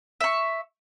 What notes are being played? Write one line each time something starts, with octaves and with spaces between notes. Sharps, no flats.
E5 C#6